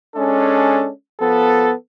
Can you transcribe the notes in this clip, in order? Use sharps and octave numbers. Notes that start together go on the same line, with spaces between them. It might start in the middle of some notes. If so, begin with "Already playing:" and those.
G#3 C#4 D4 A4
F3 B3 A4